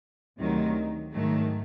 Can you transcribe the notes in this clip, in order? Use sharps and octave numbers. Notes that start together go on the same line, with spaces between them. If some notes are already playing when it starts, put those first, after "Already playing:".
D2 C3 D#3 F#3
G#2 D#3 F#3 A3